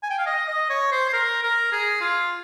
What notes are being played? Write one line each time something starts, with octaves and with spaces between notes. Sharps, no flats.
G#5
G5
F5
D#5
D#5
C#5
C5
C5
A#4
A#4
G#4
F4